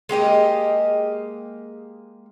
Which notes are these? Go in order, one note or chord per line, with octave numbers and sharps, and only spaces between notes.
G#3 A#3 G4 D#5